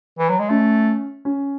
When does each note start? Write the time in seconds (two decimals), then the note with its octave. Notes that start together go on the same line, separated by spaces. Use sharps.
0.19 E3
0.29 F#3
0.39 G#3
0.49 A3 C#4
1.25 C#4